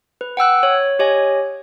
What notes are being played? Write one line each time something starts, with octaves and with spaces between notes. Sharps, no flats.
B4
F#5 G5 E6 F#6
C#5
G4 C#5 D#5 G#5